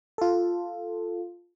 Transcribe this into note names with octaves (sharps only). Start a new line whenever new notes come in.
F4 A4